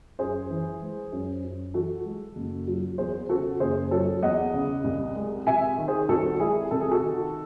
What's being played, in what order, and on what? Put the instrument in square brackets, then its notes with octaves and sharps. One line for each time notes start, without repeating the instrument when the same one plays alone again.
[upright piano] F#2 G#4 C5
E3
G#3
F#2
F#2
E3 F#4 A4
G#3
F#1
F#3
E2 G#4 C5
C#3 F#4 A4
F#1 G#4 C5
F#3 A4 C#5
E2 D#5 F#5
C#3
C2
G#3
C3 E5 G#5
D#3
G#4 C5
C2 F#4 A4
G#3 E4 G#4
C3 A4
G#4
F#4 A4
D#3